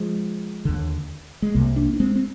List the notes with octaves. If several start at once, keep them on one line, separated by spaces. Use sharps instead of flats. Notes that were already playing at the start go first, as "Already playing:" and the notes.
Already playing: F3 G#3
D#2 D3
G#3
C2 C3 G3 A#3
A#3 D4
D4
G#3 C4
C4